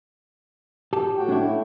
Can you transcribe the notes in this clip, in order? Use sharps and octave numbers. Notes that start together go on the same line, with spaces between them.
G4 A5
A2 F#4 G5
C#4 D4 E4
A3